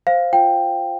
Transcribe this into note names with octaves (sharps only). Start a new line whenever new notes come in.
C5 F5
F4 G5